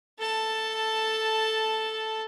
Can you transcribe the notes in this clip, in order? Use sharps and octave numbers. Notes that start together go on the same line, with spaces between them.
A4 A5